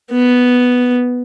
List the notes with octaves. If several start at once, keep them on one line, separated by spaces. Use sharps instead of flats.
B3